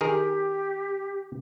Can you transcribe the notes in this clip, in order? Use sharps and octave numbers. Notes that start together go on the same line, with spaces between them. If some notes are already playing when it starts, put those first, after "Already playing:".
D#3 G4 G#4 A#4